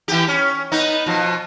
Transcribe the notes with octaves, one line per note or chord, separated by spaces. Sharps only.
E3 B3 G4
C#4
B3 D#4
B2 F3